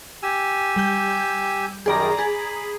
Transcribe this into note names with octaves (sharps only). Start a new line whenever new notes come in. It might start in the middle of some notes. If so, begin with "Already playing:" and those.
G4 G#5 E6
G3 G6
F#2 D#3 G3 G#4 D5 A#5
G#4 B5